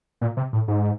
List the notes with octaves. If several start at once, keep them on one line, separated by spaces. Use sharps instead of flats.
A#2
C3
A2
G#2